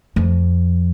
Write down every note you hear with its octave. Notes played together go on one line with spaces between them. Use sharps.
F2